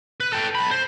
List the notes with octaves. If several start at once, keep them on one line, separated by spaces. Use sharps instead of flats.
B4
A4 G5
B1 B5
C5